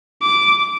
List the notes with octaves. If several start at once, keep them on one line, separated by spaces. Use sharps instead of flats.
D6